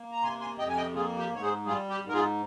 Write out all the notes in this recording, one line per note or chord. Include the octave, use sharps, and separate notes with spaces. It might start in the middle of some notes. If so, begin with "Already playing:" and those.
Already playing: A#3
A#5
C3 G#5 C6
G#5 C6
F2 D#5 G5
G#5
D#5 G5
A#3 F4 G#4
G4
G#2 C#5
G#4 C5
G3 F4 G#4
G4
G#2
A#4
F4 G#4